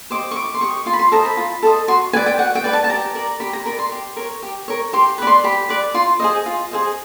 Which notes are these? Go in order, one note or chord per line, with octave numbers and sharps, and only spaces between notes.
G4 C5 D#5 D6
C#6
E4 D6
C6
G4 C5 D#5 C#6
F4 C6
B5
C6
A4 C5 D#5 A#5
B5
F4
A4 C5 D#5
F#4 C6
B4 D5 G#5
G5
F#4 F#5
G5
B4 D5
A5
A5
G4 A#5
A#4 D5
G4 B5
A#5
A#4 B5
D5
C6
G4
A#4 C#5
G4
A#4 C#5
G4 C6
B4 D5 B5
C6
G4 B5
B4 D5
F4 C6
G#4 C5 D#5
F4
G#4 C5 D#5